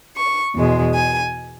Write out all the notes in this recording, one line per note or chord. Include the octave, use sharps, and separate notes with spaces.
C#6
E2 B2 G#3
G#5